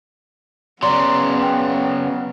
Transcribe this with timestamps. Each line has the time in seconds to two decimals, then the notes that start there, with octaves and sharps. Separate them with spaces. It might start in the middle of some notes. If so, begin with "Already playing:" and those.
0.83 C#3 F#3 B3 D5 A#5 C6
1.43 G5